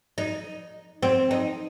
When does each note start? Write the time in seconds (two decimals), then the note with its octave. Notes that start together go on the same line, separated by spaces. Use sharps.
0.18 D#4
1.03 C4
1.31 D#4